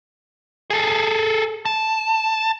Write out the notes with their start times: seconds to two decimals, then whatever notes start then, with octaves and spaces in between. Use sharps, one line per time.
0.70 G#4 A4
1.65 A5